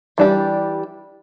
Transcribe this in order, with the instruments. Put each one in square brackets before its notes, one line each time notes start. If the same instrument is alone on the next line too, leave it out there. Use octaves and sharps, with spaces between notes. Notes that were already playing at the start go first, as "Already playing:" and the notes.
[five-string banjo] E3 G3 D4 G4